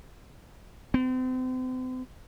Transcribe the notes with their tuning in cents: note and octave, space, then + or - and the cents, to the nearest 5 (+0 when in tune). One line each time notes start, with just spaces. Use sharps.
C4 -40